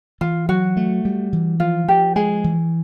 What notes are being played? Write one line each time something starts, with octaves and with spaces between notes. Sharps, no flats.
E3 F4
F#3 F#4
A3
G3
E3
F3 F4
F3 G4
G#3 G#4
E3